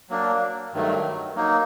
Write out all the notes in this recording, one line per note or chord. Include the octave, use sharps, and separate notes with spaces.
F#3 A#3 D4
G2 D#3 F#3 A3
F#3 A#3 D#4